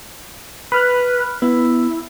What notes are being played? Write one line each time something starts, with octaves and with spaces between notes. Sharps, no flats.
B4 B5 F6 F#6
B3 E4